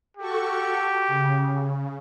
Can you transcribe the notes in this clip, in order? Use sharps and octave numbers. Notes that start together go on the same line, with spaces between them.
F#4 G4 A4 C#6
C#3
C#3